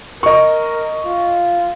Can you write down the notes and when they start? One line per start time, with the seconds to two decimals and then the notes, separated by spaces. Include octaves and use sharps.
0.23 A#4 D#5 C#6
1.05 F4